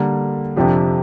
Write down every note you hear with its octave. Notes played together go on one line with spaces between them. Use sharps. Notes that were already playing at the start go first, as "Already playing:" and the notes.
Already playing: D3 G3 A#3
F2 C3 F3 D4 G4